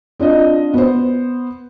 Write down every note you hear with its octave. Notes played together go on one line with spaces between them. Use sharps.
C4 D4 F4 D#5
B3 C5